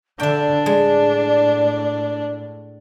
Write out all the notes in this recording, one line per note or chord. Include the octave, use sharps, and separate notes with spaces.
D3 D4 A4 E5 G5
A2 G#3 D5